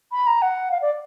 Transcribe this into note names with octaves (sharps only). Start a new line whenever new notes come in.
B5
A#5
F#5
F5
D5